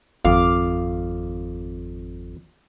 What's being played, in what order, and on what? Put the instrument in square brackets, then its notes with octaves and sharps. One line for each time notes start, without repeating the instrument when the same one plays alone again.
[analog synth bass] G#1 [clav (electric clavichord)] F2 [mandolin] F5 D6